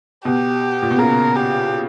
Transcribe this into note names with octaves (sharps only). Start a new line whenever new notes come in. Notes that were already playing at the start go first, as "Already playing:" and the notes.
B2 G4
A#2
B2
C#3 A#4
G4